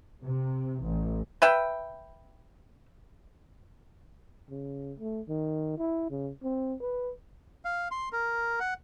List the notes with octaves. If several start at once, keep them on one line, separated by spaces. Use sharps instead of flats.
C3
A1
B4 E5 G5
C#3
A3
D#3
E4
C#3
C4
B4
F5
C6
A#4
F#5